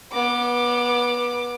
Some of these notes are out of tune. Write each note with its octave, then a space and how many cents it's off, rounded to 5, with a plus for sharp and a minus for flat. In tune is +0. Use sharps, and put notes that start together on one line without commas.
B3 -25 D6 +15